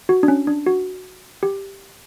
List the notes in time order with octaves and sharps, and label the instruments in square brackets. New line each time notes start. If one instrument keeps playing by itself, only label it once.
[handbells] F#4
D4
C#4
D4
F#4
G4